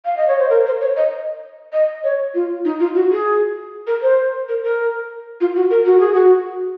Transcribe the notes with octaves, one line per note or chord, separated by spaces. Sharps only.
F5
D#5
C#5
C5
A#4
C5
C#5
D#5
D#5
C#5
F4
D#4
F4
F#4
G#4
A#4
C5
A#4
A#4
F4
F#4
A#4
F#4
G#4
F#4